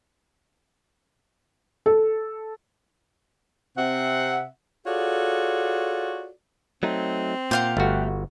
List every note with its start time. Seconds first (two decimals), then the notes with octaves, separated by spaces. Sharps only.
1.86 A4
3.77 C3 C4 E5 F#5
4.86 F4 F#4 G#4 A4 C#5 D5
6.83 F#3 A3 C4 D#4
7.51 A#2 G4 F5 F#5
7.77 G1 A3 F#4